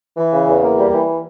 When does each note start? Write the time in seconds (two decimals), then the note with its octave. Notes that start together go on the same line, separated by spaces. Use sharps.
0.17 E3
0.32 C#3
0.47 E2
0.62 A#3
0.78 G3
0.93 E3